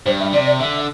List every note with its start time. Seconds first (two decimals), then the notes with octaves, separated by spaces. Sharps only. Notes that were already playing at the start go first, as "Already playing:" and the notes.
0.06 G2 C5
0.20 E5
0.33 C3 D5
0.46 D5
0.60 D3 E5